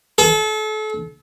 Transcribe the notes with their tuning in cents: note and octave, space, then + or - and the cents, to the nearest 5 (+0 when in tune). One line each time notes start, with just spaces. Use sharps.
A4 -35